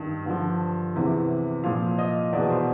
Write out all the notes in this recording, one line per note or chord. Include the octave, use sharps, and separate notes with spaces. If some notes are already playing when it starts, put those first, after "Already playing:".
Already playing: G2 D#3
G2 D3 F3
E2 C3 E3
A#2 F3 F5
D#5
E2 B2 D5
C5